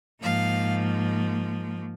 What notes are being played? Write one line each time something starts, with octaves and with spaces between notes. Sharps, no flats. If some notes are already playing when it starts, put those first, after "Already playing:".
G#2 F3 A#3 F5